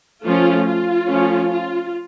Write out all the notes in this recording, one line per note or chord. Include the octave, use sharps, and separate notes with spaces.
F3 A3 C#4 F4
F4
F3 A3 C#4
F4